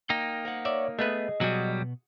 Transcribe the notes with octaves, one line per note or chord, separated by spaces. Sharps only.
A#3 D#4 G5
A#4 C5 F#5
C#5 D5 E5
A3 B3 G#4 B4 D#5
B2 F#3 G3 B3 F#4 G#4 G#5